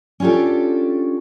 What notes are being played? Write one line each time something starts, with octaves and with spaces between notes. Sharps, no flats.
C#4 D4 F4 G4 A4